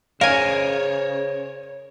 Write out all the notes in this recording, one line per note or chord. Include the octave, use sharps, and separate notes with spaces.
C#3 A#4 C5 C#5 F5 G#5